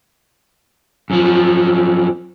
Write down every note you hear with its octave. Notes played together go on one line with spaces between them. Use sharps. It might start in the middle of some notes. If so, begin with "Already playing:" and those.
F#2 F3